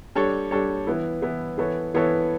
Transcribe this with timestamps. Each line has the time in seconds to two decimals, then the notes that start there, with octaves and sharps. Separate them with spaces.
0.15 G3 D4 A4 C#5
0.51 G3 D4 A4 C#5
0.87 E3 B3 E4
1.22 E3 B3 E4
1.58 E3 B3 E4 A4 C#5
1.94 E3 B3 E4 A4 C#5